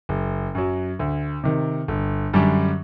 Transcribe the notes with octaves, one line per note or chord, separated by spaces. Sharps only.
F#1
F#2 F#3
D2
C3 D#3
G1
F#2 D3 G3 D4